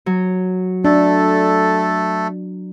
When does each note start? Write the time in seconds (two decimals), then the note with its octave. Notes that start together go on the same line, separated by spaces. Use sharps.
0.06 F#3
0.84 A3 D4 A4